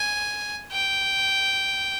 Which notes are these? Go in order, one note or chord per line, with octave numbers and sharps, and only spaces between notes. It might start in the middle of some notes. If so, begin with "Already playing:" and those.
Already playing: G#5
G5